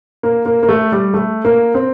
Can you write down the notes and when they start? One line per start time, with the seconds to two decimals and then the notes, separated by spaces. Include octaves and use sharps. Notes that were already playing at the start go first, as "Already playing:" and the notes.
0.23 A#3
0.46 A#3
0.63 A#3
0.69 A3
0.92 G3
1.14 A3
1.45 A#3
1.74 C4